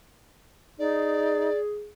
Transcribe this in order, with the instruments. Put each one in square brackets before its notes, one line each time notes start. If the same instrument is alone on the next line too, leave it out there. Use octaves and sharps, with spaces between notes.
[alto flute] D#4 [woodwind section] G#4 [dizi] D5